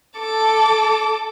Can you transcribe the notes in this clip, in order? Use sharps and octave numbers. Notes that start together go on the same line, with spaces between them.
A4 D6